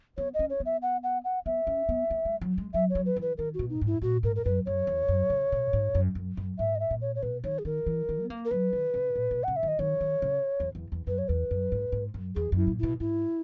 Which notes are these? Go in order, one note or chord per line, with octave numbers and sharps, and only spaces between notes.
B3 C#5
D#5
C#4
C#5
B3
E5
F#5
F#5
F#5
B3 E5
C#4
B3
A#3
G#3
F#3
G#3
F#3 E5
C#5
F#3
B4
E3
B4
D#3 A#4
B2 F#4
D#4
G#2
E4
A#2 F#4
G#2 A#4
A#4
F#2 B4
F#2 C#5
E2
F#2
C#3
B2
G#2
F#2
F#2
F#2
G#2 E5
D#5
E5
A#2
C#5
C#5
B2 B4
D#3 C#5
G#4
D#3 A#4
E3
D#3
B3
A#3
A#4
F#3 B4
D#3
C#3
A#2
B2
C#3 F#5
E5
D#3
D#5
D#3 C#5
D#3
C#3
E2
E2
E2
F#2 B4
C#5
E2 B4
F#2
G#2
G#2
F#2
E2 G#4
F#2 E4
A#2
B2 E4
G#2 E4